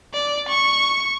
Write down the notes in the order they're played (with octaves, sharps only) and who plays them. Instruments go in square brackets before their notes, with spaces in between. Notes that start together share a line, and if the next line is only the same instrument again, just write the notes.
[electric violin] D5
C#6